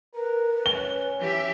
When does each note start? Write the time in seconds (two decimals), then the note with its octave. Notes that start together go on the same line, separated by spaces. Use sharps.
0.15 A#4 B4
0.66 C#4 G7
1.21 E3 G4 E5